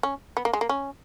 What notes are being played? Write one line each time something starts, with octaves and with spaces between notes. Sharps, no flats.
C#4
B3
A#3
G#3
A#3
C#4